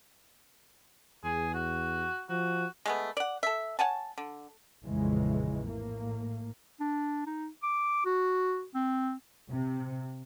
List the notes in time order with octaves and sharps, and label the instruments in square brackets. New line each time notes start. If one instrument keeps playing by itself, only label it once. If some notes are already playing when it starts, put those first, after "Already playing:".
[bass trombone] E2 [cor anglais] G#4
[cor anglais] F#4
[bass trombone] F3 [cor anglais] F#4
[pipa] G#3 A3 B3
D5 F#5
A4 E5
C#5 F#5 G#5 A5
D3
[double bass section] A#1 F2 C#3 E3 G#3
A2 A#3
[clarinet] D4
D#4
D6
F#4
C4
[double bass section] C3